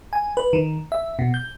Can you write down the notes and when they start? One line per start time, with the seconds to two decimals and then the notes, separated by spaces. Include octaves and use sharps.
0.13 G#5
0.37 B4
0.53 D#3
0.92 E5
1.19 B2
1.34 G6